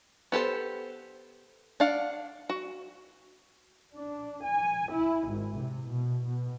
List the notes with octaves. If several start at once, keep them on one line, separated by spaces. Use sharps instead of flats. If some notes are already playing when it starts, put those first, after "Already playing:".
B3 G4 A4 C5
D4 F5 F#5
F#4
D4
G#5
E4
G#1
C3
B2
B2